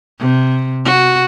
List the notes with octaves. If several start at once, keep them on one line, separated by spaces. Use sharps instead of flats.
C3
F#4